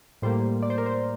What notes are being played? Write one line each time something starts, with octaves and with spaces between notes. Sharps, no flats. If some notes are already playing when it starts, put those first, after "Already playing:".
A2 G3 A#3 C5
D5
C5
A#4
C5